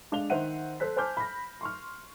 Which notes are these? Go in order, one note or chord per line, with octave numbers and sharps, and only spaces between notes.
G#3 D4 F5 F7 G7
D#3 C5 E5 F#5 D#7
A4 C5 F#6 B6
C5 G#5 A5 D6 F6 G6
B5 A#6
C6 C#6 F6